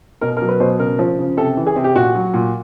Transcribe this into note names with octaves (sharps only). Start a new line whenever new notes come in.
B2 A#4
F#3 A#4
B4
B2 C5
C#3 A#4
F3
C#3
C3 A4
E3
G#4
C3
G4
A#2 F#4
F#3
A#2